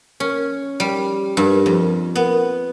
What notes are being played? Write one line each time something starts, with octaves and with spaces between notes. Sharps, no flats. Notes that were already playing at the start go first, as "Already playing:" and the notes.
C#4
G3
G2
F2
B3